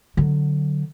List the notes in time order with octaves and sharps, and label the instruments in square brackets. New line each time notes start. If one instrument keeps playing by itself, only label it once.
[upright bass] D3 F#3